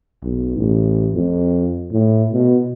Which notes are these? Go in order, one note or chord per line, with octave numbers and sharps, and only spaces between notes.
B1
A1
F2
A2
B2